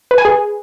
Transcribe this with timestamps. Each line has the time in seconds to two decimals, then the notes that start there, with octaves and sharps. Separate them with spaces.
0.11 B4
0.18 G#5
0.25 G#4